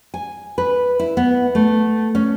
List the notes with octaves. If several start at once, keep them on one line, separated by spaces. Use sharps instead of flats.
G#5
B4
E4
B3
A3
C#4